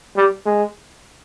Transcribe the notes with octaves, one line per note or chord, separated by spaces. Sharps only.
G3
G#3